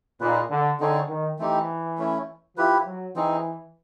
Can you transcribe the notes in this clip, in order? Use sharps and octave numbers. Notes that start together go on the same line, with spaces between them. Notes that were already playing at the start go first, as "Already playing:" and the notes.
A#2 D#4 G#4 B4
D3
D3 C4 D#4 G#4 C#5
D#3
E3 A3 C4 D#4 G4
A3 C#4 E4
F3 E4 G4 B4
F#3
E3 C4 D#4 G#4